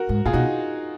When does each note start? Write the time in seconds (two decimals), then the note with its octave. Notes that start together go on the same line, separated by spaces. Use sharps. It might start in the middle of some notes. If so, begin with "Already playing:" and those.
Already playing: F#4 A#4
0.09 G#2
0.25 A#2 F4 G#4
0.33 B2 D#4 F#4